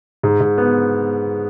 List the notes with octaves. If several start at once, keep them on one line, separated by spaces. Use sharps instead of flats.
G#2
G#2
B3